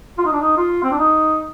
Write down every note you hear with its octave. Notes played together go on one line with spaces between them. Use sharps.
F4
D#4
D4
D#4
F4
C4
D4
D#4